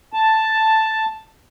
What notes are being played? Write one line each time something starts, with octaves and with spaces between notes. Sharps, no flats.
A5